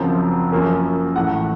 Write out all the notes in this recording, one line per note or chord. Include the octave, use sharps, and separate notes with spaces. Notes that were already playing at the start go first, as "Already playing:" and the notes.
Already playing: F#1 F#2 F3 C4
F#2 F3 A#3 C#4
A1 A2 A3 F#5